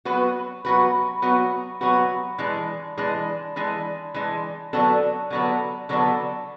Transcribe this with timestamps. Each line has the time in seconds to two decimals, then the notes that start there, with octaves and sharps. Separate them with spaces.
0.05 F#3 B3 F#4 B4
0.65 F#3 B3 F#4 B4
1.22 F#3 B3 F#4 B4
1.81 F#3 B3 F#4 B4
2.38 E3 G#3 D4
2.98 E3 G#3 D4
3.56 E3 G#3 D4
4.14 E3 G#3 D4
4.73 D3 F#3 B3 D4 A4
5.30 D3 F#3 B3 D4 A4
5.89 D3 F#3 B3 D4 A4